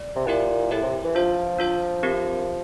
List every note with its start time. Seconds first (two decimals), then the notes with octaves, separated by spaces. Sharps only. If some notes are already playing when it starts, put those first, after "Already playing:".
Already playing: D5
0.16 C3
0.27 A#2 E4 G4 A#4 E5
0.71 A2 E4 G4 A#4 E5
0.83 C3
1.04 E3
1.15 F3 D4 F4 C5
1.59 D4 F4 C5
2.03 C4 G4 A#4